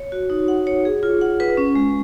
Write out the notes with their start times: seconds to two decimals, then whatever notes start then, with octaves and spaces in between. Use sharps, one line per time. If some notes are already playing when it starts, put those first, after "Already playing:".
Already playing: C#5
0.12 F#4
0.30 D#4
0.48 F#5
0.67 C#5
0.85 G#4
1.03 F4
1.21 F#5
1.40 B4
1.57 C#4
1.75 G#3